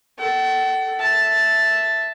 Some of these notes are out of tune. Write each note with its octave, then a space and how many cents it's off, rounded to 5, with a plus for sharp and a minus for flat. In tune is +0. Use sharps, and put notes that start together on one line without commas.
A4 +0 F#5 +45
E5 +0 A5 +0